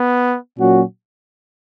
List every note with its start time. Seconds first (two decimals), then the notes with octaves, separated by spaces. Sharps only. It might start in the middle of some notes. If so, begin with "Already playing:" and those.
Already playing: B3
0.58 A#2 F#3 C#4 F#4